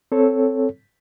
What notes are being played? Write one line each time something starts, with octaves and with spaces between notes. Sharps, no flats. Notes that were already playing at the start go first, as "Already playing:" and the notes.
C4 A4 C#5